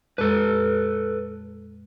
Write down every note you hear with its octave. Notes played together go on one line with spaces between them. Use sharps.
F2 A#2 G#3 A4 B4